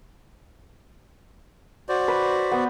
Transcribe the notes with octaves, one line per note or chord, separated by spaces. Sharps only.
F#4 C5 D5
B4
B3